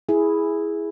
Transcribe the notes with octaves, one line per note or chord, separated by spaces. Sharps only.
E4 G#4